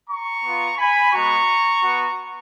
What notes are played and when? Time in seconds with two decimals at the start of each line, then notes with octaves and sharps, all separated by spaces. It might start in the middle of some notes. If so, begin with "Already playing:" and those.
0.08 A#5 C#6
0.43 B3 F4
0.77 G#5 B5
1.12 G#3 B3 F#4 A#5 C#6
1.81 B3 F#4